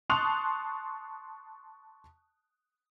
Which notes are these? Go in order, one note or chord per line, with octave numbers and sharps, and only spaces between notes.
A5 C6 C#6 D#6 F#6 F7